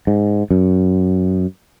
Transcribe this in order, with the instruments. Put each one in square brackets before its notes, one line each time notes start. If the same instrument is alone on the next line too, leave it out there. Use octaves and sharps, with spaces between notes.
[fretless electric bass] G#2
F#2